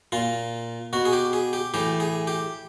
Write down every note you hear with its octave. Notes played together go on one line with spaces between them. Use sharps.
A#2 F4
B2 F#4
G#4
G4
G#4
G4
A2 E3 G4
G#4
G4